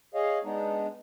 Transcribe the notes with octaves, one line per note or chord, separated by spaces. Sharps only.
G#4 C#5 D#5 F5
G#3 B3 D4 D#4